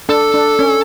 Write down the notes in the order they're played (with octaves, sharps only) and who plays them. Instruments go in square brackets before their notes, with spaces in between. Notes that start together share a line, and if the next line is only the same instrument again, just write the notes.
[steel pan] D4 [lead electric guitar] A4
[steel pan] D4
C#4